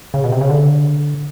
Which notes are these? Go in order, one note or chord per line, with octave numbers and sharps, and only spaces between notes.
C#3
B2
C3
C#3
D3